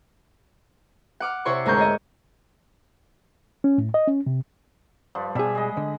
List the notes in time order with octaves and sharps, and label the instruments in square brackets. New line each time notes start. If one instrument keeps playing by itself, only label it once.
[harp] F#5 D6 F6
C3 E4 C#5 D5 C6 C#6
D2 G#2 C4 A#4 C#6 G6
C#5 D#5
[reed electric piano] C#4
A2
D#5
C#4
C3
[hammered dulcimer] G2 F3
[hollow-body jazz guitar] B2 G#4 [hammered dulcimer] G3 E5 B5
[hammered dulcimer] G#3 D#5
[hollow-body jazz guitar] D3